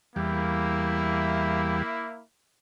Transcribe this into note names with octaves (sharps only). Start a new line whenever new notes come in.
E2 G3 A#3 E4